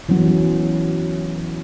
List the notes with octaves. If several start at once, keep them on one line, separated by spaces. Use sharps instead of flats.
E3 F#3 B3 C#4
F#3